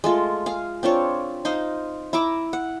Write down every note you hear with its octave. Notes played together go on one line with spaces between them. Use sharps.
G#3 A3 F4
G#4 F5
C4 D4 F4 C#5
D#4 C5 D#5 F5
E4 E5 A#5 D6
F#5